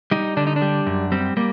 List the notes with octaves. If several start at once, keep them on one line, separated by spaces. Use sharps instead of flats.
G3 D#4
D3 D4
D#4
D4
G3
F#2
G3 C4
G3 A#3